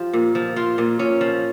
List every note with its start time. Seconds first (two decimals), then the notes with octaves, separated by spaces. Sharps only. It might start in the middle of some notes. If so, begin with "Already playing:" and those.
Already playing: F3 F4 G4
0.13 A#2
0.35 F3
0.56 F3 F4
0.78 A#2
0.99 A#2 C#4
1.21 F3